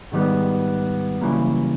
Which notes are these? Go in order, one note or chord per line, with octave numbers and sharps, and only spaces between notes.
G#2 D#3 G3 B3
F#2 C#3 E3 G3 A#3